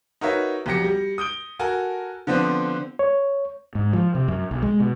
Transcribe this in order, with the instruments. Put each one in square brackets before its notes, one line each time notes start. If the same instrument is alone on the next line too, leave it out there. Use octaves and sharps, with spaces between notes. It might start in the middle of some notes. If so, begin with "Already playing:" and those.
[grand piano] D#4 F#4 A#4 B4 C#5 E5
B1 F2 G4 A#6 C#7
G3
D#6 G6 D7 G7
F#4 A4 A#4 G#5 A5
D3 F3 B3 C4 D4
[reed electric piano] C#5
[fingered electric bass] G#2
F3
C3
F#2
B1
G#3
B2